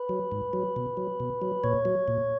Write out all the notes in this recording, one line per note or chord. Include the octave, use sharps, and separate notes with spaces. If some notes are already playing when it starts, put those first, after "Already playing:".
Already playing: B4
F#3
G#2
F#3
B2
F#3
B2
F#3
A#2 C#5
F#3
A#2